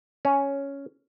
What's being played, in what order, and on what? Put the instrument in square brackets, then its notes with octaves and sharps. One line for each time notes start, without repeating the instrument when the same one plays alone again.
[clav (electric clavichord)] C#4